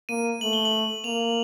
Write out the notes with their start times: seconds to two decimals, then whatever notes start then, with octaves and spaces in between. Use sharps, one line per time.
0.09 A#3 D#7
0.41 A3 F#7
0.53 G7
0.65 F#7
1.04 A#3 F7